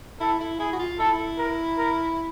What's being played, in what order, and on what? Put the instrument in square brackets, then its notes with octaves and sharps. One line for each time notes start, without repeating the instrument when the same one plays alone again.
[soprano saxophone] E4 [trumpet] A4
[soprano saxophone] E4
[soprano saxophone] E4 [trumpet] G#4
[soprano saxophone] F#4
F4
[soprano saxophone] E4 [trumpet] A4
[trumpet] A#4
A#4